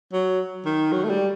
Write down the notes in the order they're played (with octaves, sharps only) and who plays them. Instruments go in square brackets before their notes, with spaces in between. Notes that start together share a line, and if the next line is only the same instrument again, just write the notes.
[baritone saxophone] F#3
D#3
F#3
A3
G3